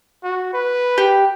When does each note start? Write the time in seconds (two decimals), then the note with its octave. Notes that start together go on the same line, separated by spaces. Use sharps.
0.24 F#4
0.54 B4
0.98 G4